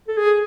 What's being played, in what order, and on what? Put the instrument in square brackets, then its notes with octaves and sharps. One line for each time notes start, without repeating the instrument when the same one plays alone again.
[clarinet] A4
G#4